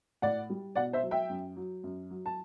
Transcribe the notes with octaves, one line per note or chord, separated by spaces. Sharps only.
A2 D5 F#5
G3
B2 D5 F#5
C5 E5
F#3
E5 G5
F#2
F#3
F#2
F#3
A5